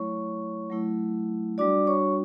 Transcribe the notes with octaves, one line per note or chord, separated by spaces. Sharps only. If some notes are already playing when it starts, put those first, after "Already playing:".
Already playing: F#3 A3 E4 C#5 C#6
F#3 A3 E4
G3 D4 F#4 D5 D6
C#5 C#6